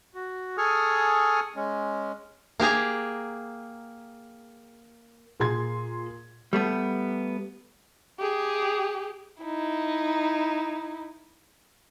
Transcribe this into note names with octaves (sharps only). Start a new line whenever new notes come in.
F#4
G#4 A4 G#5 C#6 D#6 F6
G#3 C#4
A#3 G4 G#4 A#5
A#2 G#4 C6 G#6
G3 A3 B3
G4 G#4
D#4 E4